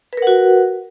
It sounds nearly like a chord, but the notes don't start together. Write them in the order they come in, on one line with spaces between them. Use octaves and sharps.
B4 A#4 F#5 F#4